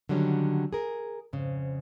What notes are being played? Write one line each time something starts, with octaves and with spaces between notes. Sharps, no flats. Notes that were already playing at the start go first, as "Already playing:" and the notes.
D3 D#3 F#3 G3 C#4
G#4 A#4
F2 G#2 C#3